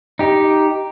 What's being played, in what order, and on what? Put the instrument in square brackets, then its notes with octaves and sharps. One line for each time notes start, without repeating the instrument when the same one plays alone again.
[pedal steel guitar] D#4 G4